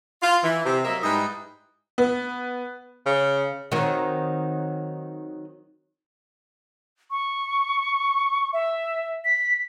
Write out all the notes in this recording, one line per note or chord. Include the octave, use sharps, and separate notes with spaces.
F4
E3
C3
F#3 A#3 A#4 D#5 E5
G#2 G3 D#4 E4 B4 D#5
B3
C#3
D#3 F#3 C4
C#6
E5
B6